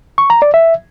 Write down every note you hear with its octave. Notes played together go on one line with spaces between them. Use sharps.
C#6
A#5
D5
E5